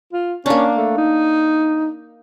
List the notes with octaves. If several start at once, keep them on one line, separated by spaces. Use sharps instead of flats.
F4
A#3 C#4 D4
A3
D#4